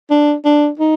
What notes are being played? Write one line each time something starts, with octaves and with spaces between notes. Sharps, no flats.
D4
D4
D#4